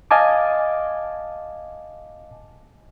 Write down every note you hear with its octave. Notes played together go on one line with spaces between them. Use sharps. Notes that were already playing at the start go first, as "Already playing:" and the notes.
D#5 F5 G#5 A5 D6